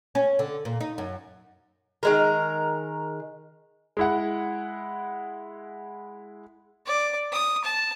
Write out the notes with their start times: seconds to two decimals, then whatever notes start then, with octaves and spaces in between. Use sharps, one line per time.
0.15 C#4
0.39 D3
0.65 A#2
0.81 D#4
0.98 F#2
2.03 D#3 G#3 A#4
3.97 G#3 E4 F#5
6.86 D5
7.32 D#6
7.64 A5